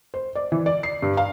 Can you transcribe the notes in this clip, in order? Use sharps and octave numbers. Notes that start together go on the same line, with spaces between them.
C5
D5
E3
D5
C7
G2
F5